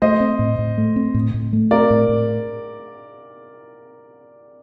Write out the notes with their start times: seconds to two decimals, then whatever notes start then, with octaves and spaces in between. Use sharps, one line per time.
0.02 A3 C5 D#5
0.20 C4
0.39 A2
0.59 A2
0.78 A3
0.96 C4
1.14 A2
1.34 A2
1.53 A3
1.71 C4 A#4 D5
1.91 A2
2.09 A2